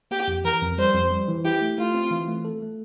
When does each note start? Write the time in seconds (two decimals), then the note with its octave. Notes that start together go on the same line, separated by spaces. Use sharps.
0.11 A#3 G4
0.28 F2
0.45 E3 A#4
0.62 F2
0.78 G3 C5
0.94 F2
1.11 G3
1.28 E3
1.45 E4 G4
1.61 A3
1.78 A3 F4
1.95 C4
2.11 E3
2.28 A3
2.45 A4
2.62 A3